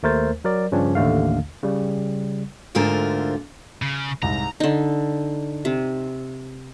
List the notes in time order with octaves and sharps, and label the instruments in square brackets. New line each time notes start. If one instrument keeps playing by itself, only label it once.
[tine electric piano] D#2 A3 A#4 C5 A6
F#3 A#4 D5
G2 C#3 F3 C#4 D4
A1 D#2 D3 A3 F5
C#3 G3
[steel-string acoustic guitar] D2 G#2 D3 A3 F4 A#4
[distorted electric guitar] C#3
[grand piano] C2 G#2 [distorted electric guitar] A#5
[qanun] D3 D#4
C3